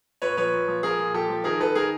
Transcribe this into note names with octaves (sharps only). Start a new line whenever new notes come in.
A#2 B4 C#5
F3 B4 C#5
A#2
F3
F3 G#4 A#4
A#2
F3 G4 A4
F3
D#3 G#4 A#4
D#3 A4 B4
D#3 G#4 A#4